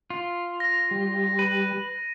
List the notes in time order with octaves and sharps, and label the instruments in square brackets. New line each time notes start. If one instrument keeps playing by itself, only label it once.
[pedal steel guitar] F4
[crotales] A#6
[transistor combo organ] G3
[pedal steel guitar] B4 [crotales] D#7